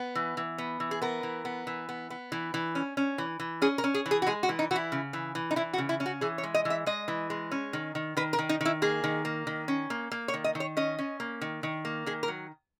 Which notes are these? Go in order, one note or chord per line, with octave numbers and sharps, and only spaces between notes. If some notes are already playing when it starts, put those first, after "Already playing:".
Already playing: B3
E3
E3
B3
E3
G#4
B3 A#4
E3
B3
E3
B3
B3
E3
E3
C#4
C#4
E3
E3
C#4 G#4
A#4
C#4
G#4
E3
G#4
F#4
G#3 G#4
F#4
E3
D#4
E3 F#4
E4
C#3
E3
E3
D#4
E3 E4
F#4
C#3
E4
C#4
F#4
E3 G#4
C#5
G#3
D#5
E3
E5
G#3 D#5
E3
G#3
C#4
D#3
D#3
D#3 B4
A#4
D#3
D#4
D#3 E4
A#3 G#4
D#3
A#3
D#3
C#4
A#3
A#3
C#5
D#3
D#5
D#3
C#5
C#4 D#5
C#4
A#3
D#3
D#3
A#3
D#3 G#4
A#4
F#3